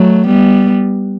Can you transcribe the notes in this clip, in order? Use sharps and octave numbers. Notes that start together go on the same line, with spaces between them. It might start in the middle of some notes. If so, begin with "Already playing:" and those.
Already playing: F#3 A3
G3 B3